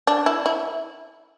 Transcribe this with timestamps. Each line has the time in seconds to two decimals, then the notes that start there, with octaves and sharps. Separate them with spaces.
0.07 D4
0.26 E4
0.46 E4